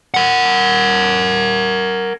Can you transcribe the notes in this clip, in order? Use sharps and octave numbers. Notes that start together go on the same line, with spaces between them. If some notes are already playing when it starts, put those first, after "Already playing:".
A#4 F#5